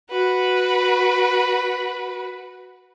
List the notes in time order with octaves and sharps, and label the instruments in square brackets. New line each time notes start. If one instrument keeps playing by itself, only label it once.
[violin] F#4 B4